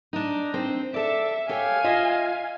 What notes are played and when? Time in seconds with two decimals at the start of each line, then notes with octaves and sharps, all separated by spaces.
0.13 D4 D#4
0.54 C4 C5
0.94 A4 D5 E5
1.49 G4 A4 C#5 F5 G#5
1.84 F4 D#5 E5